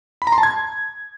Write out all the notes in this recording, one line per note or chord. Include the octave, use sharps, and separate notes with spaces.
B5
A#5
C6
A5
G#6